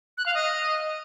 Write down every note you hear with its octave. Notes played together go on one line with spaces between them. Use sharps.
F#6
F5
D#5